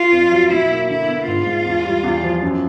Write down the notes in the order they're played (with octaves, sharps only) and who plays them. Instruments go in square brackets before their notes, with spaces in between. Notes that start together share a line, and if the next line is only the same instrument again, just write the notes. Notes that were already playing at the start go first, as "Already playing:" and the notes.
Already playing: [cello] F4
[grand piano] F2
F#3
[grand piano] B2 [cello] E4
[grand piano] A#3
[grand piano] D3 [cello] E4
[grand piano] B3
[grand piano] G#2 [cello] F4
[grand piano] G#3
E2
G3
E2
F3
F#2